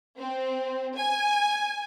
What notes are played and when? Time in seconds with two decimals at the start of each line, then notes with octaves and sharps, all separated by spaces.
0.17 C4
0.96 G#5